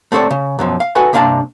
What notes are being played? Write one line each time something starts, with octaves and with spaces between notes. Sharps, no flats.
A3 C4 A4 C#5 D5
C#3
F#2 B2 F3
F5
F#4 A4 B4 D#5 F#5 G#5
G2 C3 A#3 D4 F5 A5